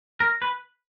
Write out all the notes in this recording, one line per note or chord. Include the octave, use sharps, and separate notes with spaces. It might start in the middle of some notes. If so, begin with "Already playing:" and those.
A#4
B4